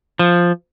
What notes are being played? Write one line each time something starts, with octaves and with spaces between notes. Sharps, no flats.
F3